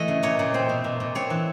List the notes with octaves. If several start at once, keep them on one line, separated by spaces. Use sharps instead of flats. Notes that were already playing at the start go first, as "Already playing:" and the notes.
Already playing: E3 A3 D#5
C#3
A#2 C#5
A#2
C4 C5
B2
A#2
A#2
C4 C#5
E3